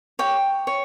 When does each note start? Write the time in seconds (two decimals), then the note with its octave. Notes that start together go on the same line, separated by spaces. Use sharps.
0.19 G4 C#5 G5
0.67 C#5